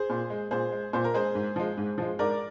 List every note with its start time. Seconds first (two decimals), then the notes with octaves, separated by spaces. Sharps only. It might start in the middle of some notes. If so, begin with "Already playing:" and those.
Already playing: G#4 C5
0.09 A#2
0.30 G#3
0.51 A#2 G#4 C5
0.72 G#3
0.93 A#2 C5
1.04 A#4
1.14 G#3 G#4 C5
1.35 G#2
1.56 F3 G#3
1.77 G#2
1.98 F3 G#3
2.19 G#2 A#4 D5